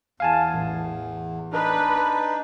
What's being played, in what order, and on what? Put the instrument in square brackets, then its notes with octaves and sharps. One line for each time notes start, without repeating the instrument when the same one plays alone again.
[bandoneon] E2 [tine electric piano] F5 G#5 A5
[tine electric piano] A1
[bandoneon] D4 D#4 [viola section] B4